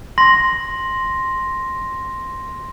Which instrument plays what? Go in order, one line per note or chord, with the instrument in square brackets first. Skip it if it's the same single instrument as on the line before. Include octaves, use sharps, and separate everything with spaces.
[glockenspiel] C6 A#6